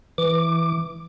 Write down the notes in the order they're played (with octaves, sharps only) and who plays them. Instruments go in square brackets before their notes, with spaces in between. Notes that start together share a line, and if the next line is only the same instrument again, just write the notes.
[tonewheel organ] E3 D6